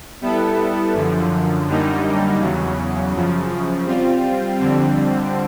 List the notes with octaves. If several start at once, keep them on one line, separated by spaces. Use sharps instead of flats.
G3 B3 E4 A4
F#2 D3 F3
F#2 D3 G3 A#3 D#4
E2 C#3 F#3
F#2 C#3 F3
G3 C4 F4
F2 D3 G3 C4